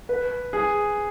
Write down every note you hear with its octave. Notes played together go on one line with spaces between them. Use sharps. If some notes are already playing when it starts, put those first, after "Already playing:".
B4
G#4